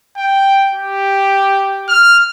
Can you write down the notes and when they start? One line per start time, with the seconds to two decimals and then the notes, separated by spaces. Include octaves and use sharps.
0.17 G5
0.73 G4
1.89 F6